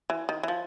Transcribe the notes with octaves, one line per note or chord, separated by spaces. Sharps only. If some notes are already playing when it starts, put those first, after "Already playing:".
E3
D#3
E3
F3